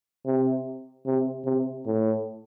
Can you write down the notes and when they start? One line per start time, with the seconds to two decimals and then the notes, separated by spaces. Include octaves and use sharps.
0.26 C3
1.06 C3
1.45 C3
1.86 A2